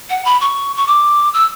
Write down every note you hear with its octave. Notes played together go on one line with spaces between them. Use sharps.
F#5
B5
C#6
C#6
D6
E6